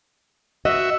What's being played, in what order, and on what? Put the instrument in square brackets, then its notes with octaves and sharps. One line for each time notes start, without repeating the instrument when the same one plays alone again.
[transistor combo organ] F#4 E5 [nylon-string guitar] D#5